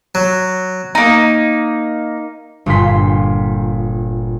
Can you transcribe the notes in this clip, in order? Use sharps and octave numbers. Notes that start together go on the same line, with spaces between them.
F#3
A#3 D#4
G1 G2 A#2 F4 C6 B6